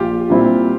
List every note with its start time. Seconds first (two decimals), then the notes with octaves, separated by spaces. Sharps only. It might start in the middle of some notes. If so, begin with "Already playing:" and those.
Already playing: A#1 F4 G4
0.30 A#2 G3 C4 E4